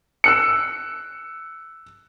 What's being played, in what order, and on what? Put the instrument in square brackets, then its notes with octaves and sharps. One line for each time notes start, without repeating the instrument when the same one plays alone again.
[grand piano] E6 F#6 C#7